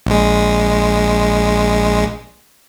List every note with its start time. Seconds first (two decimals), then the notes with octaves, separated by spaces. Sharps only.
0.07 A#1 G#3